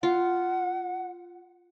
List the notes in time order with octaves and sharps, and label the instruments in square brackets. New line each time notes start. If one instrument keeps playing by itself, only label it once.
[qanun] F4 [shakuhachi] F#5